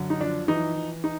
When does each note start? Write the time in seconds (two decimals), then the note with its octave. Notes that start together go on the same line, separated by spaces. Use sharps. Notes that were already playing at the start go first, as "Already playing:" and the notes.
Already playing: F#2 D3
0.10 D#4
0.21 F3 D4
0.48 E3 D#4
0.76 E3
1.04 D#4